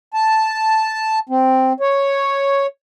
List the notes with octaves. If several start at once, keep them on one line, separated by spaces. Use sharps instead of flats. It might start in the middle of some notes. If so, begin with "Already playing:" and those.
A5
C4
C#5